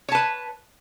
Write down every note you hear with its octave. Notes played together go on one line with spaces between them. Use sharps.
B4 C#5 A5